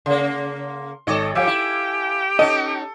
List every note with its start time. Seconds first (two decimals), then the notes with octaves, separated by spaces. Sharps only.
0.06 C#3 A#3 C6
1.07 G#1 A4 C#5 D#5 D6
1.35 F3 G3 G4 F5 G#5 E6
1.47 E4
2.39 C#4 D#4 A4 D#5